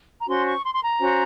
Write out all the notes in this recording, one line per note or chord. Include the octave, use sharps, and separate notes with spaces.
A#5
C#4 F#4 C5 C6
C#6
C6
C6
A#5
C#4 F#4 C5